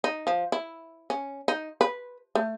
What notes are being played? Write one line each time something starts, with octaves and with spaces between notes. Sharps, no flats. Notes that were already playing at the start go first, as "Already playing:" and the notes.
D#4
F3
E4
C#4
D#4
B4
A3